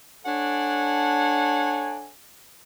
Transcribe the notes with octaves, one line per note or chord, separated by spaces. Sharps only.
D4 A4 C#5 F#5 G#5